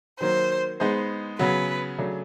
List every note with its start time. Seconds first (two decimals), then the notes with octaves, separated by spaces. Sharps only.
0.20 D#3 F#3 A#3 C5
0.80 G#3 B3 D#4 G#4 C5
1.39 C#3 F#3 B3 B4
1.99 C#3 F#3 A3 D4